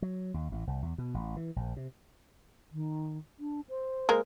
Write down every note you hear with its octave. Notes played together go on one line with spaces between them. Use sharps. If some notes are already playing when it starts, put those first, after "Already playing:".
F#3
D#2
A1
C2
E2
B2
A1
E3
A#1
C3
D#3
D4
C5
G#3 A#3 A#4